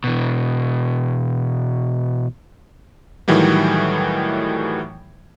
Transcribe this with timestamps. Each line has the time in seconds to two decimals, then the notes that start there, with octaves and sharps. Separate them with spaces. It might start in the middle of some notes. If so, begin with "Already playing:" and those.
0.04 B2 E3
3.28 A2 D#3 E3 F#3 G3